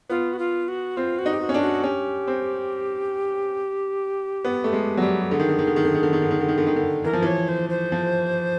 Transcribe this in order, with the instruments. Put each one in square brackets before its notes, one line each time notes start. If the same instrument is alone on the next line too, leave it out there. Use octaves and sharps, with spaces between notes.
[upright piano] B3 [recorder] F4
[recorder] F#4
F4
F#4
[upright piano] C4 [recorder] F4
[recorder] F#4
[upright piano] D#4
[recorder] G4
F#4
[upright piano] C#4
D4
[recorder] F#4
[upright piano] C#4 [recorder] G4
[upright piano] C4
B3
A3
G#3
F#3
G3
[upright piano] D3 [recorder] G#4
[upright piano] D#3
D3
D#3
D3
D#3
D3
D#3
D3
D#3
D3
D#3
D3
D#3
D3
D#3
D3
[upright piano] E3 [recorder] A#4
[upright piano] F3
[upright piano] E3 [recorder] C#5
[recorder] C5
C5
[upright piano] F3